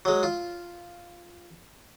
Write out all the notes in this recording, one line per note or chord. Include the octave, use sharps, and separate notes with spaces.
F#3 G#3
F4